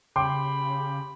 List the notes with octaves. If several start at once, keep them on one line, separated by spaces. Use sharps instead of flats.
C#3 G4 G5 B5 C6 D6